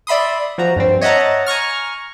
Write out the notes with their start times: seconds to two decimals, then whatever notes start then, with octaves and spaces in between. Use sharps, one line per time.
0.07 D5 E5 B5 C6 D#6
0.58 F3 F#4 A#5
0.76 G2 G3 C4
1.01 C#5 D#5 E5 F#5 A5 A#5
1.46 G#5 A#5 C#6 F6